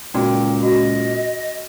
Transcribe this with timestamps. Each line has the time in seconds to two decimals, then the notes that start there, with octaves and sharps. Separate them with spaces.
0.14 C#2 A#2 F#4 D5 G5
0.63 F#4 D#5